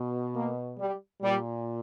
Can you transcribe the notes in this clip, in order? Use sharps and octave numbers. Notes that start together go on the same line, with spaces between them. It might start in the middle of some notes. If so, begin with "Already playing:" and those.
Already playing: B2
A#3
G3
A#2 G3